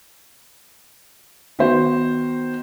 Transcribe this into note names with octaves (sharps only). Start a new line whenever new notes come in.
D#3 B3 F#4 C5